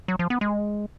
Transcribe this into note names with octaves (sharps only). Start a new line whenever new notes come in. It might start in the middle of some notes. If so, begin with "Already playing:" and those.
F#3
F3
B3
G#3